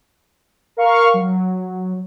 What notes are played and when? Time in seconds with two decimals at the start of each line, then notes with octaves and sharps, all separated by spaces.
0.77 A#4 F5 C#6 F6
1.14 F#3